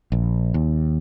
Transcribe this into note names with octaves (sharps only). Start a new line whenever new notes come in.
A#1
D#2